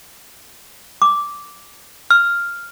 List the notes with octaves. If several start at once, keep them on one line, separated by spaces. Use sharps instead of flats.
D6
F6